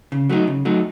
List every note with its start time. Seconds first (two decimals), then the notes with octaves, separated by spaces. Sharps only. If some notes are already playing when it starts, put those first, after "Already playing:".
0.12 C#3
0.29 F#3 A3 D#4
0.47 C#3
0.65 F#3 A3 D#4